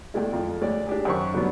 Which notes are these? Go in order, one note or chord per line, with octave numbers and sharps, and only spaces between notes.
E2 G#3 A3 D5 G5
F2
D2 G#3 C#5 D5
D4 G4 G#4
F#2 D#3 C5 C#6
D3 F#3 G3 A3 B3 D4